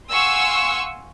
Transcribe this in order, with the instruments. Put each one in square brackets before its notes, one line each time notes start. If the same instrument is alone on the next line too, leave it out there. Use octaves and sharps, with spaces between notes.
[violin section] F5 F#5 G#5 C6 C#6 E6